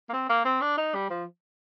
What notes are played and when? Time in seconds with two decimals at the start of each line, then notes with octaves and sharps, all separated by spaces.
0.09 A#3
0.13 C4
0.29 A#3
0.45 C4
0.61 D4
0.78 D#4
0.95 G3
1.10 F3